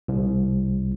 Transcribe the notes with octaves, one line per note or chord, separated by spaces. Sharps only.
C2